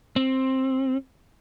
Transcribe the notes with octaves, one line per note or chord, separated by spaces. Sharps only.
C4